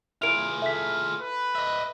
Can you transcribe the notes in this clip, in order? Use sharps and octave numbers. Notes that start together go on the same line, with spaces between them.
E4 F4 G#4 A#4 E5 D7 F7
A4 E5 B6
B4
D#5 E5